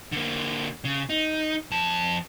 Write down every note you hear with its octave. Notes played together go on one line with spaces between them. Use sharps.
D3 A#3
C#3
D#4
F2 A5